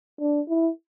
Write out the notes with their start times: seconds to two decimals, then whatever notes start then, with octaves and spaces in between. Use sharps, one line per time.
0.20 D4
0.49 E4